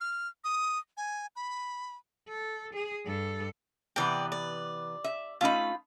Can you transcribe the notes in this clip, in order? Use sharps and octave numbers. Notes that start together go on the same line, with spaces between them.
F6
D#6
G#5
B5
A4
G#4
G2 A4
C3 E3 B3 D5 G5
D5
E5
A3 C#4 D#4 F4 B5